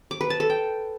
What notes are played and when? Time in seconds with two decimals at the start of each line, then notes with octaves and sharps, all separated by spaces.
0.11 D6
0.21 B4
0.30 A5
0.40 A4
0.50 G5